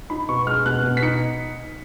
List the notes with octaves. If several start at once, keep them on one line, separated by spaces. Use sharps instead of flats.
D#4 B5
B2 C#6
G#3 F6
B2 F#6
B2
B6
D#4 C#7